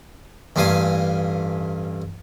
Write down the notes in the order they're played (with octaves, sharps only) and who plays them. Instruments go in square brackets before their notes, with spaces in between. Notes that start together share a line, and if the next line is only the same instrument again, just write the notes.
[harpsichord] A1 G2 A#3 F5 G#5